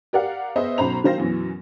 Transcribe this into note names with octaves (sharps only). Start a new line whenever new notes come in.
G4 A#4 D5 F5 F#5
B3 G#4 C5 D#5 E5
B1 C#4 C5 A#5 B5 F7
D#3 F#3 C5 F5 A#6
F#2 B2 E3 C#4